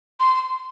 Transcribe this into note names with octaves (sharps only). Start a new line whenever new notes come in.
C6